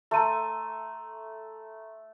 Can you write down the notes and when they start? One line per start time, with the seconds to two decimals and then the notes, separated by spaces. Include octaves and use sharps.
0.11 A3 A#5 C6 D#7